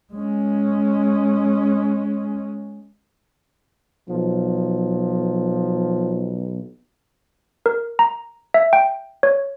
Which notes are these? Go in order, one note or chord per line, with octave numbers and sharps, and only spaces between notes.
G#3 C#4
B1 F3
A#4
A#5
E5
G5
C#5